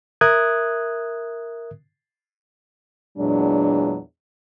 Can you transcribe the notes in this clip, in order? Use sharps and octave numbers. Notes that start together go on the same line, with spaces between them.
A#4 E5 D#6 F#6 G#6
E2 A#2 F#3 G#3 D4